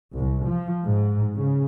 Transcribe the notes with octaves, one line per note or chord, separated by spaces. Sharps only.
C2
F3
G#2
C#3